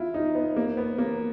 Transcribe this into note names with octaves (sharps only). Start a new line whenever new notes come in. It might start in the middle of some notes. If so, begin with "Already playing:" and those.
Already playing: E4 F4
D#4
B3
A#3
B3
A#3